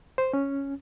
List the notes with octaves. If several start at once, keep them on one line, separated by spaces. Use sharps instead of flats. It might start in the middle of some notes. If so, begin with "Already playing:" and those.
C5
C#4